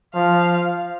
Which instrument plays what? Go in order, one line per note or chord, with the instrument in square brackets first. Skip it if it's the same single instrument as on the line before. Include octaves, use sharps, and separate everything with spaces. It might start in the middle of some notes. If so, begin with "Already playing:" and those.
[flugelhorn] F3 [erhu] F5